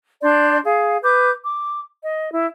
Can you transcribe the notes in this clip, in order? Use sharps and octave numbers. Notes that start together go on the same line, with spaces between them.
D4 D5 C6 G6
G#4 F5
B4 D6 G6
D6
D#5
E4